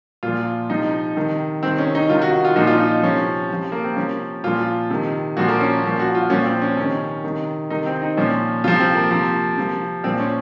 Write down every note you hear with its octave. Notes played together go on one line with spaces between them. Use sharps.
A#2 F4
F3
C3 F3 D#4
C3 D#3
C3 D#3 C4
C#4
D#4
C3 D#3 F4
F#4
F4
A#2 F3 D#4
F4
D#4
C3 F3 C#4
C3 F3
A#3
C4
C3 F3 C#4
A#2 F3 F4
C3 D#3
A#2 F3 F#4
A#3
C#4
A#2 F3
F#4
F4
A#2 F3 C#4
C4
C#4
C3 D#3 C#4
C3 D#3
C3 D#3 D#4
C4
D#4
A#2 F3 C#4
C3 F3 F4
C4
A#3
C3 F3
C3 F3
A#2 F3 C4
C#4